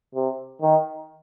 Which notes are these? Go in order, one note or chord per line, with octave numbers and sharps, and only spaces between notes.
C3
D#3